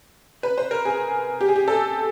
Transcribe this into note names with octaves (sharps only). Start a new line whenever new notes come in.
B4
C5
A#4
G#4
G4
G#4
G4
A4